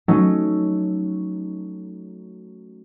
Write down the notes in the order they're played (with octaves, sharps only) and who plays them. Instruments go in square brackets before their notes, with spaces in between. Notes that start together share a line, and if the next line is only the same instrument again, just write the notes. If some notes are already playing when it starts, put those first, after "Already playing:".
[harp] F#3 A3 C#4 D#4